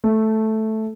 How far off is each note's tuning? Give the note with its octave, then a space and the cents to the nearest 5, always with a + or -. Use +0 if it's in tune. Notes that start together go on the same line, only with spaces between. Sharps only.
A3 -5